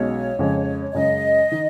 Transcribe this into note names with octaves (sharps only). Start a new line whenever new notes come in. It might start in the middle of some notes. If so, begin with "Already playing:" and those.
Already playing: B1 B2 G#3 C#4 F#4 C#5
F2 C#3 G#3
F#2 C#3 G#3 C#4 D#5
D#3